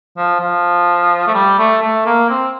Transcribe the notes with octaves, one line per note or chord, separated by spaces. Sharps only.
F3
F3
A3
G3
A3
A3
A#3
C4